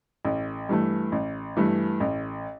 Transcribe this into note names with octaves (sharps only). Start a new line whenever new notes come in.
A1
G2 E3 A3
A1
G2 E3 A3
A1